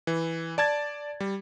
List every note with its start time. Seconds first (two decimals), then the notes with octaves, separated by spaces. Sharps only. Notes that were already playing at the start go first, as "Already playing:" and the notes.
0.07 E3
0.58 D5 A5 G#6 A6
1.20 G3